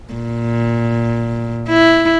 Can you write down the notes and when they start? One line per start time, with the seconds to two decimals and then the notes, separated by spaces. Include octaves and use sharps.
0.14 A#2
1.68 E4